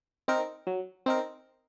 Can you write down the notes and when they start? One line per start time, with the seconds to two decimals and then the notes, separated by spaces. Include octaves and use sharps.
0.28 C4 D#4 A#4
0.67 F#3
1.06 C4 D#4 A#4